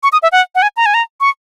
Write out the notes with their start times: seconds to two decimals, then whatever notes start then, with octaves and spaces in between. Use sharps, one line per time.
0.03 C#6
0.13 D#6
0.23 E5
0.32 F#5
0.55 F#5
0.62 G#5
0.77 A#5
0.86 G#5
0.94 A#5
1.21 C#6